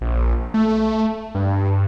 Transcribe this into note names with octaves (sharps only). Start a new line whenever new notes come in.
A#1
A3
G2